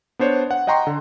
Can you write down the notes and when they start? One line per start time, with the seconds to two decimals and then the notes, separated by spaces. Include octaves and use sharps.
0.19 B3 D4 C5 C#5
0.51 F#5
0.67 D#5 F#5 G5 A#5 C6 C#6
0.87 D3